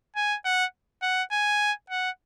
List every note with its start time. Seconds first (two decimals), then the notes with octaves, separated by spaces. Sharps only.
0.16 G#5
0.45 F#5
1.02 F#5
1.32 G#5
1.90 F#5